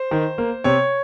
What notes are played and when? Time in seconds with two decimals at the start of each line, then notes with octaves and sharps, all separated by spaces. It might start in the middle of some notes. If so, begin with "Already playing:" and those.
Already playing: C5
0.11 D#3
0.38 A#3
0.64 C3 C#5